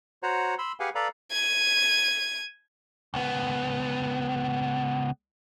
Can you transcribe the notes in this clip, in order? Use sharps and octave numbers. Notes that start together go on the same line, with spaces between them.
F#4 C5 C#5 F#5 A#5
B5 C6 E6
G4 G#4 B4 F5 F#5 G#5
A4 B4 D5 F5 A#5 B5
G#6 D#7
C#2 B3